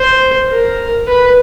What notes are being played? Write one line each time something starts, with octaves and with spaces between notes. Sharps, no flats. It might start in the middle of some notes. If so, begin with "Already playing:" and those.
Already playing: C5
A#4
B4